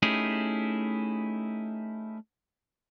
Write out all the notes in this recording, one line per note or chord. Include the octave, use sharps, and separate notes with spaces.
A3 C#4 D#4 E4 G4 G#4